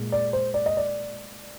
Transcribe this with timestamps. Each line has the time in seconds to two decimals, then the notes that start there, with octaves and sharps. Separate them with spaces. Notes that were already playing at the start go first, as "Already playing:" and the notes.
Already playing: A#2 G#3
0.12 D5
0.33 C5
0.54 D5
0.66 D#5
0.77 D5